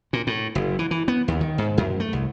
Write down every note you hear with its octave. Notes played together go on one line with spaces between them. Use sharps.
A#2
A2
F#1
E3
E3
B3
D#2
D#3
G#2
F#2
A3
C2